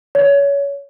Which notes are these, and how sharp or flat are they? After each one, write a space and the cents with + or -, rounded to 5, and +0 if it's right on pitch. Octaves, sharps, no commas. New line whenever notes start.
C#5 +25